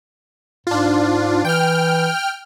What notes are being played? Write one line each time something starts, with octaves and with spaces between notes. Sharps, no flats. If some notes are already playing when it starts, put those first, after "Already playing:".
G#2 D4 F4
E3 G5 F6